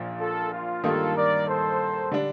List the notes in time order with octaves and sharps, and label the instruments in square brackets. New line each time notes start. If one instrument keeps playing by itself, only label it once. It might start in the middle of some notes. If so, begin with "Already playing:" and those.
Already playing: [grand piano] A#1 A#2 F3
[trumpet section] F4 A4
F4
[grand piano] G2 D#3 G3 A#3 D#4 [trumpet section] F4 A4
[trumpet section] A#4 D5
A4 C5
[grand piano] D3 G3 D4